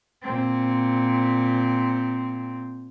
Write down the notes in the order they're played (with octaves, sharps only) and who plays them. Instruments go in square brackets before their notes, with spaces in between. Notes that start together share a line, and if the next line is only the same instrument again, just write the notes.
[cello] A#2 C4